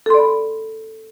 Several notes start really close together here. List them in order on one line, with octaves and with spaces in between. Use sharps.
A4 C6 D5 B5